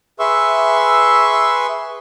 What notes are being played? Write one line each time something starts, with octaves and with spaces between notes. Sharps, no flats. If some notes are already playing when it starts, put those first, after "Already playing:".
G#4 B4 E5 C6 C#6 E6